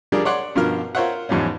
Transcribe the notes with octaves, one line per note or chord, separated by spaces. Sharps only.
F3 G3 D4 G#4 A#4
C#5 D5 F#5 C6
G2 B2 F3 A#4 F6
F4 A#4 C5 C#5 E5 F#5
E2 G#2 F3 G3 C#4